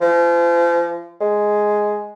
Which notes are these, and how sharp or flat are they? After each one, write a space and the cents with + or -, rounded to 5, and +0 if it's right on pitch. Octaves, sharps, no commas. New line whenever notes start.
F3 -35
G#3 +5